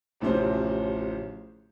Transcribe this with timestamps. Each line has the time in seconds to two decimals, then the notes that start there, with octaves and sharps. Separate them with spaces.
0.20 D1 A1 C3 F3 C#4 C5